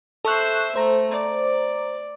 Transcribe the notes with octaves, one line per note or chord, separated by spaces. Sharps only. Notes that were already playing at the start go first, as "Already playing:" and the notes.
A4 C5 E5 C#6 F#6
A3 C5 A#5
D5